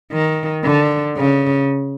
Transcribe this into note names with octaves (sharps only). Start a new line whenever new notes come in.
D#3
D3
C#3